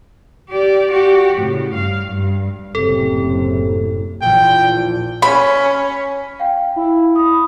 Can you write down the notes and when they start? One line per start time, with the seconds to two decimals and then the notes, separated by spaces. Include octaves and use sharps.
0.50 G4 D5
0.92 F#4 G4
1.38 A2 C#3
1.73 G2 F5
2.06 G2
2.75 F#1 A2 C3 A4
4.22 A#1 E2 A#2 G5
5.22 C#4 B5
6.40 F5 G5
6.76 E4
7.15 B5 D#6